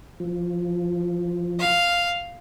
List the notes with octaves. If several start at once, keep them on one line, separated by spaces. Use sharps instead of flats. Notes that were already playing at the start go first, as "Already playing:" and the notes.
F3
F5